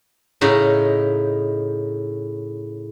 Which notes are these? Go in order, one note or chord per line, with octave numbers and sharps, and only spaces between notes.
A2 C#3 D#4